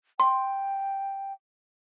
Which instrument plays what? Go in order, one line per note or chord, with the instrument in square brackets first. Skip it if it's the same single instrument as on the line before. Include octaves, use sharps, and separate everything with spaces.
[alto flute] G5 [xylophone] C6